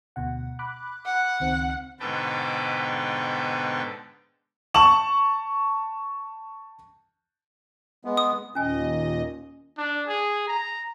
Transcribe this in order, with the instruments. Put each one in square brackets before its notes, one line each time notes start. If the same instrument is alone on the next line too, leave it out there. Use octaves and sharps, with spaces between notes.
[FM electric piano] D2 B2 F#5
B5 D6 F#6
[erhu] F#5
[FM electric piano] C#2 D#3 C4
[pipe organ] G#2 B2 D3 B4 G5 A5
[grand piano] A5 C#6 E7 F#7
[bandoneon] G#3 B3
[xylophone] D#6
[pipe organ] D#2 A#2 D#5 [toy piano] C#4 G#5
[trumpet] D4
G#4
A#5